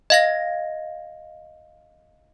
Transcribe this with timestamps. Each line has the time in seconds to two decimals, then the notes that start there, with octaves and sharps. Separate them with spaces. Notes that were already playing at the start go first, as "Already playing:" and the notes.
0.10 D#5 F5 A#6